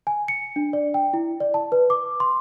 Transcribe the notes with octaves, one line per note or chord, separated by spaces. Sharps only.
G#5
C#7
D4
D5
G5
E4
D5
A5
B4
D6
C6